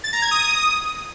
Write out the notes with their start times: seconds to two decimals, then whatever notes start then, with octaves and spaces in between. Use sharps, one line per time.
0.04 A6
0.13 A#5
0.22 G#6
0.31 D#6